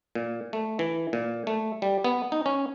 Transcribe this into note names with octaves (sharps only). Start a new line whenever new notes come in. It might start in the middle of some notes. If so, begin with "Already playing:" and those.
A#2
A3
E3
A#2
A3
G3
B3
D#4
C#4